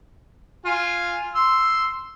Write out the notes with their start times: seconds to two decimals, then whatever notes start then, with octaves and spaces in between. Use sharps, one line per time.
0.65 F4 G#5
1.35 C6 E6